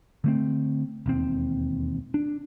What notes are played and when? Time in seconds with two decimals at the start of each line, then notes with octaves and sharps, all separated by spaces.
0.24 D3 A3 C4
1.06 E1 D#2 C4
2.14 D4